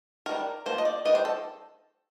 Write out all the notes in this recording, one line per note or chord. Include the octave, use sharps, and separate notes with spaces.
D#3 G3 D4 A#4
F3 A#3 D4 C5
D#5
D5
D#3 G3 D4 D#5
C5
A4